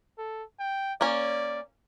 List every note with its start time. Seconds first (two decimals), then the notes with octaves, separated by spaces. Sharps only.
0.18 A4
0.59 G5
1.01 A#3 C#4 D5